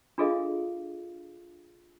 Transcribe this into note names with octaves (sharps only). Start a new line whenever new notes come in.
D4 F4 G#4 A4 D#5 F5